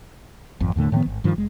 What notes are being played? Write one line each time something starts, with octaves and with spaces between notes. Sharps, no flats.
G#1 F2
D#2 A2 D3 A3
A2 D#3 F3 B3
G#1
G2 D#3 F3
F1 G#3